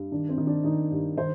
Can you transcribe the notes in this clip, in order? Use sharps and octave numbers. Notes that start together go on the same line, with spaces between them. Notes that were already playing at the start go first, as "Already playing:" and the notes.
Already playing: G2
D#3 D4
C4
D#3
D4
D#3 D#4
G2
D#3 C5